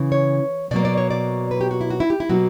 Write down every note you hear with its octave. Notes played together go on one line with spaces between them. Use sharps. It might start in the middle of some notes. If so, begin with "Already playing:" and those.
Already playing: C#3 E3
C#5
B2 F#3 A#3 D5
D5
C#5
D5
B4
G4
F#4
E4
F#4
E4
G4
E4
B2 F#3 A#3 F#4